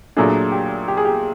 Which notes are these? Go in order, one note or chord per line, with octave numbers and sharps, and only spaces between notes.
A#2 F#3 A3 D4 G#4
G4
G4
G#4
G4